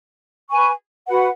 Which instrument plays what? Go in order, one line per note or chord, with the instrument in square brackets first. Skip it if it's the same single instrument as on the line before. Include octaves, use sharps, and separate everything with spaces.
[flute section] B4 G#5 C#6
F#4 B4 F#5